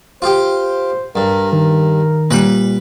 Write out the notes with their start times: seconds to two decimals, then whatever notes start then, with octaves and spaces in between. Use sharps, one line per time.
0.22 F4 G4 C5
1.16 G2 A#4
1.53 D#3 A#4
2.31 A#2 G3 B4 B5